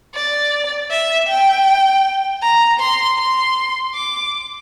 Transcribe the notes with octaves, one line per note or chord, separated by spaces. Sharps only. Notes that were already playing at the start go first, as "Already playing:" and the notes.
D5
E5
G5
A#5
C6
C6
D6